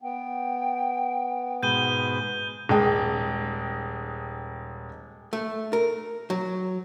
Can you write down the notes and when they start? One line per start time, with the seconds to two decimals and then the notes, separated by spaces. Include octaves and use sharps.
0.02 B3 G5
1.63 G#2 B2 G6 D#7 G7
2.69 D#1 G#3 G5
5.33 A3
5.73 A#4
6.30 F#3